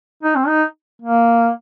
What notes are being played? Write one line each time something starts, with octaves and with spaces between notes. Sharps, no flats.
D#4
C4
D#4
A#3